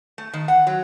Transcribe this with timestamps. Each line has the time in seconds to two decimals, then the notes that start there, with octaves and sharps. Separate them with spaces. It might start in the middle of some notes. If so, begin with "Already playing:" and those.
0.18 A3
0.33 D#3
0.48 F#5
0.67 F#3